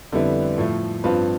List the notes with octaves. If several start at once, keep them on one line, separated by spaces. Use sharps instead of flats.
F2 D3 G3 B3 E4
A2 F3 A3
G2 F3 C4 F4 B4